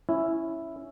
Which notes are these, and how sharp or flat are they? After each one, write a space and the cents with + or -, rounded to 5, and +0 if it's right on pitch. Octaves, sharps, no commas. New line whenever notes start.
C#4 +0 E4 +0